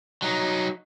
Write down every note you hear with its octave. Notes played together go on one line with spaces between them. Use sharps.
F#3 D#4